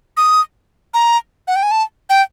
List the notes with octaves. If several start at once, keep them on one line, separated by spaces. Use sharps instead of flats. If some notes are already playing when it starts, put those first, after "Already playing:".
D#6
A#5
F#5
G5
G#5
A5
G5